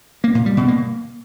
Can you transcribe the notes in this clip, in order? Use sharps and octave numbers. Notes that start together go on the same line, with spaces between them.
A#3
A#2
G3
B2
A#3